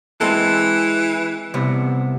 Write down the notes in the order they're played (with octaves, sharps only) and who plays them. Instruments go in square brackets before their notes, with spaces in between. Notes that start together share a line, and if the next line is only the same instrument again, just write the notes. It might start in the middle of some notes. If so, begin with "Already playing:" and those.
[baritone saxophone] E3 [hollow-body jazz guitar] G#3 C4 A4
[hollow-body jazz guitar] C2 C3 B3